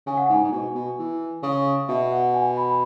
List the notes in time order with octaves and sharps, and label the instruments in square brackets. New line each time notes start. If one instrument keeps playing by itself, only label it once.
[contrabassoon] C#3 [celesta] G#5
[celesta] F#5
[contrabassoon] G#2 [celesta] G#5
[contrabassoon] G#2
B2
B2
E3
C#3
[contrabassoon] B2 [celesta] E5
[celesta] F#5
G#5
B5